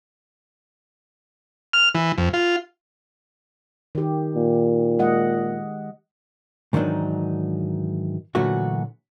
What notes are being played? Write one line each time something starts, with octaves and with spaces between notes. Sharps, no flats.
F6
E3
F2
F4
D#3 G4
A#2
G#3 D#5 F#5
G#2 D#3 E3 F#3 D4 D#4
A#2 D3 E3 F#3 A3 F#4